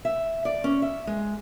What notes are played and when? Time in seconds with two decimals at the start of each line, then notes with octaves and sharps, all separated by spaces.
0.05 E5
0.45 D5
0.64 C#4
0.82 E5
1.07 G#3